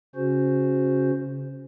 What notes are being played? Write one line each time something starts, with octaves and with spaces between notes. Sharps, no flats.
C#3 C#4 F#4 C5